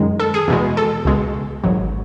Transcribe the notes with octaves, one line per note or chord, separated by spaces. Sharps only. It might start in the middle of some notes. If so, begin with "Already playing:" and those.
Already playing: F#2 D#3 G#3
A4
G#4
E2 B2 G#3
A4
C#2 B2 G#3
G#1 G#2 F#3